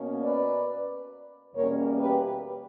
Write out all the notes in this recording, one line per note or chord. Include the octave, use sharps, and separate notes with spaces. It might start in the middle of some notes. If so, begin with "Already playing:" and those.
Already playing: B2 A#3 C#4
B4 D5
E2 B2 G3 A#3 C#4 A#4 C#5
G4 B4